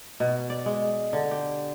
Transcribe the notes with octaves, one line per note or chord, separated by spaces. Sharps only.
B2
D5
G#3
D3
G4